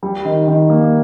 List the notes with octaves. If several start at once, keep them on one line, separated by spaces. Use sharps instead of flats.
G3
D#3
D#3
A#3